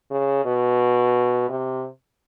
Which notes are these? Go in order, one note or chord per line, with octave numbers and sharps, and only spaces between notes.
C#3
B2
C3